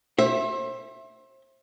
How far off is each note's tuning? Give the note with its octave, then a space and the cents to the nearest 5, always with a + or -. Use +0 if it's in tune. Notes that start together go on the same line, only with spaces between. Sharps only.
C5 +35 E5 +0